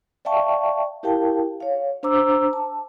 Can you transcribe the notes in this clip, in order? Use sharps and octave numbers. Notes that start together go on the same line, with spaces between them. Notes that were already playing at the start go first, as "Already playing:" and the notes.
D5 E5 F5 G5 A5 C#6
E4 G4 A#4 F5 G5 A5
C#5 F5
D4 C5 A#5 D6 E6
A5